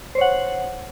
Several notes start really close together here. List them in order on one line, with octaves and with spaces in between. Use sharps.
C5 C#5 F#5